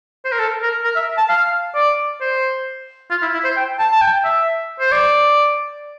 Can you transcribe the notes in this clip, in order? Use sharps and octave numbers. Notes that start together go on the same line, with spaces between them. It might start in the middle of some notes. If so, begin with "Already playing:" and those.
C5
A#4
A4
A#4
A#4
E5
A5
F5
D5
C5
F4
E4
E4
C5
G5
A5
A5
G5
E5
C5
D5